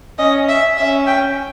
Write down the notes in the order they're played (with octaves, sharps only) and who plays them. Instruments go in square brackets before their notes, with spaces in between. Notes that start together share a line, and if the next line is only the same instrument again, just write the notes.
[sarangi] C#4 [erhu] D#5
[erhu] E5
[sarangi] C#4 [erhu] E5
[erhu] G5